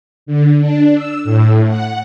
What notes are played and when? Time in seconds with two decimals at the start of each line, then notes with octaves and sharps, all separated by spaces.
0.26 D3
0.60 D4
0.95 E6
1.24 A2
1.68 F#5